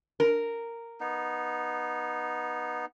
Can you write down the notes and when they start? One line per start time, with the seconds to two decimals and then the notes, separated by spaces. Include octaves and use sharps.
0.20 A#4
1.00 B3 D#4